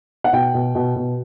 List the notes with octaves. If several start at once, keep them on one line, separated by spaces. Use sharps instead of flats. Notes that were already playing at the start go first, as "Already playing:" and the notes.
F#5
B2 G5
B2
B2
B2